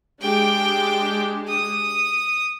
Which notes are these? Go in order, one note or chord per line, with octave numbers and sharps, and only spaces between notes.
G#3 D4 G4 G5 D6
D#6